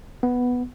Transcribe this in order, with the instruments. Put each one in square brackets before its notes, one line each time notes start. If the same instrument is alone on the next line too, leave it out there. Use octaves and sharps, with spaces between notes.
[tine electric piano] B3